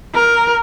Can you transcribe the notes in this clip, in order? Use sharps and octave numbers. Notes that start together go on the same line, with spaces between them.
A#4